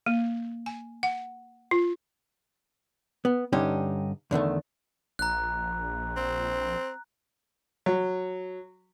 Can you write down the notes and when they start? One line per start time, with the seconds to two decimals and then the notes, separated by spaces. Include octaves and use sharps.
0.06 A#3
0.66 G#5
1.03 F#5
1.71 F4
3.25 B3
3.53 G2 D3 C#4 D#4 G4
4.31 E2 D3 D#3 A3
5.19 A#1 A#5 F#6
6.17 C4
7.86 F#3